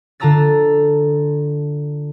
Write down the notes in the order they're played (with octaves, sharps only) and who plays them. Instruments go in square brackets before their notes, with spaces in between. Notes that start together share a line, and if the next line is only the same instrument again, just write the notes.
[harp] D3 F4 A5 A#5 E6 A6